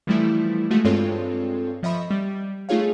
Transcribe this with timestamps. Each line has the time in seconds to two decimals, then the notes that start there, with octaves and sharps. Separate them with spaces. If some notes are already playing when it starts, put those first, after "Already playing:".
0.07 E3 F3 G3 A3 E4
0.71 F3 G#3 A3 F4 F#4
0.85 G2 G#3 C4 F4 A4 C#5
1.83 F3 D#5 E5 B5 C#6
2.10 G3
2.69 A3 D#4 F4 G#4 C#5 F5